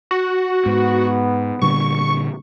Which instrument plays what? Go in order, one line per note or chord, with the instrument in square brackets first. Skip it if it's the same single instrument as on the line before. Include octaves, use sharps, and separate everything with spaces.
[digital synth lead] F#4
[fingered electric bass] G#2 [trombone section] B3
[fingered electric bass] A#2 D3 G3 [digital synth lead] C#6